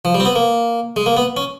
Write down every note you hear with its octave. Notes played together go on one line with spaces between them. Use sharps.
F3
G3
C4
B3
A#3
G#3
A#3
B3
C#4